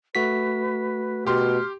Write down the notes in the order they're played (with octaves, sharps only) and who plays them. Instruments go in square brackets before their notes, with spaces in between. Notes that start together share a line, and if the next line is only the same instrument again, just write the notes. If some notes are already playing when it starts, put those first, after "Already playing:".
[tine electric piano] A3 F#4 B6 [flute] B4
[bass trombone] B2 [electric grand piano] G4 C6 [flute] F6